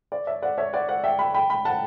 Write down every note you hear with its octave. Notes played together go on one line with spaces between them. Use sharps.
D5
C#5 E5
D5 F#5
C#5 E5
D5 F#5
D5 F#5
E5 G5
G5 B5
G5 B5
G5 B5
F#5 A5